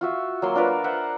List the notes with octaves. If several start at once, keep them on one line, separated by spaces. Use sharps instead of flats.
F4 F#4 E5
F#3 A#3 C6
D4 F4 A#4 B4
C5 E5 F#5